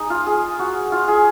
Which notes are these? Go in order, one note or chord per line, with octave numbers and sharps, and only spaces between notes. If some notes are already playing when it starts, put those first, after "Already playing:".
Already playing: D#4 G#4
F4
G#4
F#4
F4
G#4